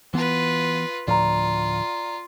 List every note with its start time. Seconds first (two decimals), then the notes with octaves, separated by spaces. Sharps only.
0.14 E3 B3 F4 B4
1.07 D2 A2 F3 F4 D5 A#5